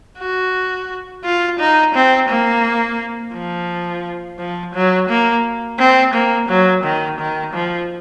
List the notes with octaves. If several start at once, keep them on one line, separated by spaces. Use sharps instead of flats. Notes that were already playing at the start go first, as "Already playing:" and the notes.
F#4
F4
D#4
C4
A#3
F3
F3
F#3
A#3
C4
A#3
F#3
D#3
D#3
F3